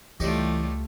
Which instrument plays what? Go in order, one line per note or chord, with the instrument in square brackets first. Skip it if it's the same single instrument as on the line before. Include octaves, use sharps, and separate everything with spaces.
[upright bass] C#2 [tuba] E3 [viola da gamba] G3 A3 F4 [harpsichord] D#4 G4 C#5